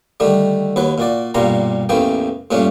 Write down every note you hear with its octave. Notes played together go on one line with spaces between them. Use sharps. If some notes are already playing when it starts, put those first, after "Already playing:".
D3 D#3 G3 A3
D#2 F#3 B4
A#2 F#4 D5
B1 G2 A#2 G3 A#5 C6
A1 E2 E3 A3 A#3 G5
G2 A#2 A3 A#3 C#4